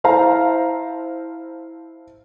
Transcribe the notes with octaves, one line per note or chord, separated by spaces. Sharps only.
E4 C5 F5 A5 A#5